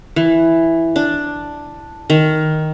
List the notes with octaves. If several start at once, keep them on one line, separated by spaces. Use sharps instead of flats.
E3
D4
D#3